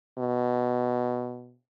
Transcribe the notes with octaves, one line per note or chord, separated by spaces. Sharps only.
B2